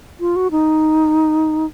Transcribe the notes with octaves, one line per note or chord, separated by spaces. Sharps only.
F4
F#4
D#4